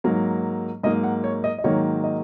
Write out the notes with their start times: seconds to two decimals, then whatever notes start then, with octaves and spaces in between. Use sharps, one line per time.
0.04 G#2 F#3 A#3
0.83 G#2 F#3 A#3 D#5
1.04 F#5
1.24 C#5
1.44 D#5
1.58 D#5
1.64 G#2 D#3 F#3 A#3 C#5
2.04 D#5